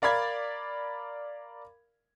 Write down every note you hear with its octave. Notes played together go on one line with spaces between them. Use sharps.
A#4 D5 F5 B5 G#6